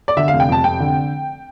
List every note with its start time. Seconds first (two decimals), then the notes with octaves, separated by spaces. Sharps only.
0.08 D5
0.17 D3 E5
0.28 F5
0.33 F1
0.40 G5
0.49 F2 A5
0.64 F1 G5
0.80 D3